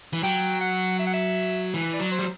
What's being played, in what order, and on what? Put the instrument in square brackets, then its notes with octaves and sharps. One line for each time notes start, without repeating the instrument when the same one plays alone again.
[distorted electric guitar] E3
[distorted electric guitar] F#3 [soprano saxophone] G5
[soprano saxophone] F#5
E5
F#5
E5
[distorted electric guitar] E3
[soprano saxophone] D5
[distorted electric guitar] F#3
[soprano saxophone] C5
[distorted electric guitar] G3